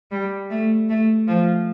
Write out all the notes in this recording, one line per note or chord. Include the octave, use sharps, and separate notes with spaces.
G3
A3
A3
F3